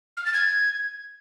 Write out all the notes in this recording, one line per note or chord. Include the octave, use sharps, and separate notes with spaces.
F6
A6
G#6